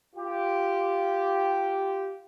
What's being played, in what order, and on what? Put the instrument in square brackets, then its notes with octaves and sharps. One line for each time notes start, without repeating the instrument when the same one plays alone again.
[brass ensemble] F4 G4